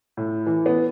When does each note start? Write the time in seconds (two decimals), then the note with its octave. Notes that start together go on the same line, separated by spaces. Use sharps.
0.17 A2
0.47 E3
0.66 B3